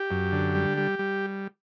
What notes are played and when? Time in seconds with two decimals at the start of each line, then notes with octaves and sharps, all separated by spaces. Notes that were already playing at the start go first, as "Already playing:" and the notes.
Already playing: G4
0.11 F#2
0.32 D3
0.55 G3
0.78 G3
0.99 G3